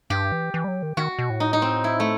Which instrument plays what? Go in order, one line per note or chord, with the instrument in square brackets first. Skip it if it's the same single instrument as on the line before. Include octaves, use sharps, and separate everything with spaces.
[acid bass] G2 [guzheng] G4
[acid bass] E3
E3
G3
F#3
D#3
[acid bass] D#3 [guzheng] F#4
[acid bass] B2
A2
[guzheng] D#4
D#4
C4
E4
A3